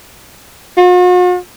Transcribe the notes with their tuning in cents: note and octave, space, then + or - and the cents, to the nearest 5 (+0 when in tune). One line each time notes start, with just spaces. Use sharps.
F#4 -45